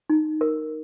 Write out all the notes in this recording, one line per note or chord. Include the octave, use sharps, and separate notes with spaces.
D#4
A#4